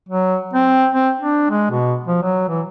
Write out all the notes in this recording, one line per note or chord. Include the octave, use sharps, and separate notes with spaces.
F#3
C4
C4
D4
G#3
B2
F3
F#3
E3